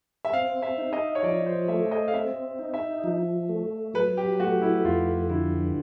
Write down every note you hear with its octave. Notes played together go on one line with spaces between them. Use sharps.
E5
C4 F5
E5
D#4
D#5
C#5
F3 D5
C5
A3 E5
D#5
F5
C4 E5
D#4
E5
F3
A3
F#3 B4
G4
A3 F#4
E4
F2 F4
D3 E4